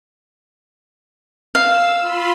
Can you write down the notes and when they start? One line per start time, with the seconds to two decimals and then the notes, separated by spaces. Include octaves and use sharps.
1.55 F5 E6
2.01 F4 B5 C6